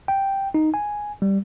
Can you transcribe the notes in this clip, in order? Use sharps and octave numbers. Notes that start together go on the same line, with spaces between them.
G5
D#4
G#5
G3